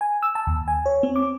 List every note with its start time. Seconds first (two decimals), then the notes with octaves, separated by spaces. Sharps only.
0.01 G#5
0.23 E6
0.35 A5
0.47 D#2
0.68 G#5
0.86 C#5
1.03 C4
1.16 D6